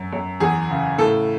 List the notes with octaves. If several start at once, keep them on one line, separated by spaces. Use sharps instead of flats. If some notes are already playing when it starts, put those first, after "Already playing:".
Already playing: F#2
F#2
E2 G#4
C#3
A2 A4